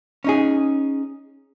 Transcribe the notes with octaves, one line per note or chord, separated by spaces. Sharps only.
C#4 D#4 G#4